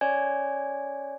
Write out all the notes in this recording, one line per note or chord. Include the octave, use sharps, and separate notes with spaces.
C#4 C#5 D5 G#5 G#6